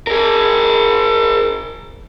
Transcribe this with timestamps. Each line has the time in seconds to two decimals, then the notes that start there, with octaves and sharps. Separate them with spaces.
0.07 G#4 A#4